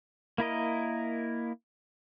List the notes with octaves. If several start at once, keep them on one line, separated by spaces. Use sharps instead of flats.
A#3 E4 A#4 D#5